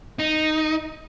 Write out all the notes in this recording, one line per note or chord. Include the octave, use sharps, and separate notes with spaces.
D#4